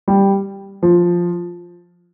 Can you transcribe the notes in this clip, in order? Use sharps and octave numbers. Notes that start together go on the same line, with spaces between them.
G3
F3